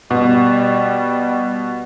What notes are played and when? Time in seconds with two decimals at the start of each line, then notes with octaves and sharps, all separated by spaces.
0.10 B2 G3